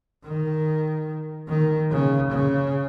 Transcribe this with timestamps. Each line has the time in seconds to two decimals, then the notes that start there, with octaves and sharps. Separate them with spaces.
0.25 D#3
1.48 D#3
1.91 C#3
2.31 C#3